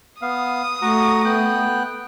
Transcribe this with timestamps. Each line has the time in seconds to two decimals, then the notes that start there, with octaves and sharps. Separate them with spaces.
0.22 B3 F5 D#6
0.82 A3 F#4 A#5 C#6
1.25 B3 G5 F#6